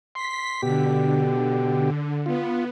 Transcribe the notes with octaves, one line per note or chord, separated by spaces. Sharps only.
C6 B6
B2 D3 G4
B3 F4